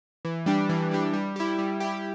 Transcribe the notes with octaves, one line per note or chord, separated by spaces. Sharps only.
E3
G3 D4 G4
E3
G3 D4 G4
G3
E4 G4
G3
E4 G4